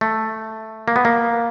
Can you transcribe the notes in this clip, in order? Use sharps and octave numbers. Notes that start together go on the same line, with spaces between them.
A3
A#3
B3
A#3